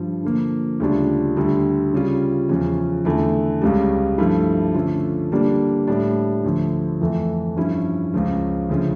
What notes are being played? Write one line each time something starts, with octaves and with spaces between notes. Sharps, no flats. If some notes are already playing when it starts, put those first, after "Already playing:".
Already playing: G2 F3
D3 F3 A#3
D2 C#3 G3 D4 F4
D2 D3 G3
C#3 G3 C#4 F4
E2 C#3 F3 C#4 F4
E2 D3 A3 E4
C#2 C#3 G3
G2 F3 A3 E4
D3 F3 A3 C#4 F4
D3 G3 A#3 D4
A2 G3 D4
D2 D3 F3
F2 E3 A3
G2 F3 C#4 E4
C#2 C#3 F3
D2 C#3 F3 C#4